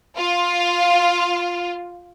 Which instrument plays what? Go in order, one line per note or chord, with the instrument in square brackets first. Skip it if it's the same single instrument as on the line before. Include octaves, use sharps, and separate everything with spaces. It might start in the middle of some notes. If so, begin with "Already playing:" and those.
[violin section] F4